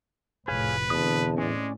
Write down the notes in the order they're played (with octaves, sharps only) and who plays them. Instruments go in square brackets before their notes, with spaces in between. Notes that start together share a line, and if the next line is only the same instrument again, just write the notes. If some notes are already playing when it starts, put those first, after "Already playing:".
[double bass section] F1 F2 A2 [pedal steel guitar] G#4 C#5 F5 [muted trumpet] B4
[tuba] E2 [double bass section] B2 D3 C4 [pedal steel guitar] A5 D#6
[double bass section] A2 [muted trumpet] G#3 [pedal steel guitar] C#4 D5